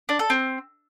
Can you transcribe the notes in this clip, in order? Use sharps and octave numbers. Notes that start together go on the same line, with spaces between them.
D4
A4
C4